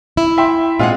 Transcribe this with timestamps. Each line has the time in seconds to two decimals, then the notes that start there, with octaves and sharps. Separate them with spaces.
0.17 E4
0.38 E5 G5 C6
0.79 A#2 G#3 C4 F4 G#4 F#5